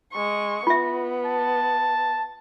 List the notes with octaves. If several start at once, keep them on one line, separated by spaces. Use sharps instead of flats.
G#3 C#6
B3 F4 E5
A5